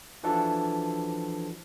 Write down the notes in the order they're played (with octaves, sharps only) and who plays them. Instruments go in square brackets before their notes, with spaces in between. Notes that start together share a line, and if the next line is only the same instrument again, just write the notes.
[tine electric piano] E3 F3 D4 F#4 A4